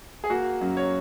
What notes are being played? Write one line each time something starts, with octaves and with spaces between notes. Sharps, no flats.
G#4
A#3 F#4
F#2
C#5